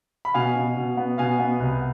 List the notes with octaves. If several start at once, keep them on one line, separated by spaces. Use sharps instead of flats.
B5
B2 F5 G#5
B2
B2
B3
B2 F5 G#5
B3
C2